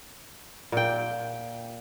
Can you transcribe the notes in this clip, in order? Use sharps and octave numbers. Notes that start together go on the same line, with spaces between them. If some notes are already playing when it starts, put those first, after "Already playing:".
A#2 G5